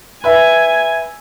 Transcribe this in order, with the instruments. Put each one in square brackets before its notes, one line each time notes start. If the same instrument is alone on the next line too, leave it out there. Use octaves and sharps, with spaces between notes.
[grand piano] B4 E5 [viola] G#5